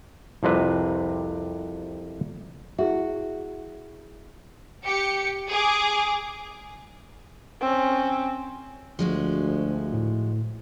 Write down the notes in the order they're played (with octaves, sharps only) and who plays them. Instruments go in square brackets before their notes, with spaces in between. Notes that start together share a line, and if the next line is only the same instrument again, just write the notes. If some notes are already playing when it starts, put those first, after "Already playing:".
[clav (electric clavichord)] C2 F2 C3 B4
[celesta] E4 G#4 E5 [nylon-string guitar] F#4
[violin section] G4 C#7
G#4 D6
[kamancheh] C4 C#4
[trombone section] D2 [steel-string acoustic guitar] F3 G#3 F#4
[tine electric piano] A2